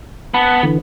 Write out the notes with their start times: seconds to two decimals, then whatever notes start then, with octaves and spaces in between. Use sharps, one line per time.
0.34 B3 F#5 A5 B5
0.63 D3 E3